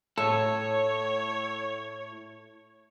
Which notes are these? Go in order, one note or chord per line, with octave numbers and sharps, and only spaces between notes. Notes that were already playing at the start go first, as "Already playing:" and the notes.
A2 A4 C#5